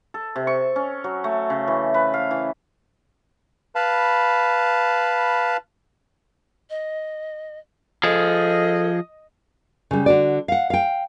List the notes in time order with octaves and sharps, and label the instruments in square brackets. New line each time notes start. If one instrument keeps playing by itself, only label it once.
[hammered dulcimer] A4
C3
C#6
C#4
F#3
A3
C#3
E3
B4
F5
E3
[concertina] B4 F5 A5 B5
[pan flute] D#5
[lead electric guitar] F3 G#4 [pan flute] A4 [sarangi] D#5
[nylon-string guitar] C#3 G3
D3 F#4 D5
F5 F#5
F5 G5